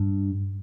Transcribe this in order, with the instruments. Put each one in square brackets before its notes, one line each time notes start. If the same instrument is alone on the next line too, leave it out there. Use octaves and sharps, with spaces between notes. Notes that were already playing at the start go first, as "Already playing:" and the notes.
Already playing: [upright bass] G2